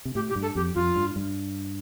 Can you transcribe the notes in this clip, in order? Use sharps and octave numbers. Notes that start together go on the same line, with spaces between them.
C3
A2 G4
G4
G2
A4
F2 G4
F2 F4
G2
G2